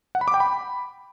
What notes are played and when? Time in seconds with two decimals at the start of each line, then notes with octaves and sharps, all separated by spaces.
0.15 F#5
0.21 B5
0.28 D6
0.34 G5
0.40 B5